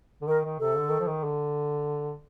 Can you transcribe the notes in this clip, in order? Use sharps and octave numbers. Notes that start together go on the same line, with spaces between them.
D3
D#3 A#4
D#3
C3 A4
D3
D#3
F3
D#3
D3